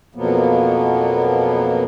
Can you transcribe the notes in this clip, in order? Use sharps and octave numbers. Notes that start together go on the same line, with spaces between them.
F2 B2 F3 F#3 A#3 B3